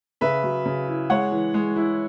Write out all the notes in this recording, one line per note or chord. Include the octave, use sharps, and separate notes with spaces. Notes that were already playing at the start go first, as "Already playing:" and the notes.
C#3 B4 E5
F#3
C#3
E4
G#3 C#5 F#5
E3
G#3
E4